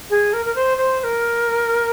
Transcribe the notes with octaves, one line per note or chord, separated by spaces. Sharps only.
G#4
A#4
A#4
C5
C5
C5
A#4